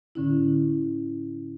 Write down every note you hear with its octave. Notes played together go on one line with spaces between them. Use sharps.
A2 D3 C#4 E4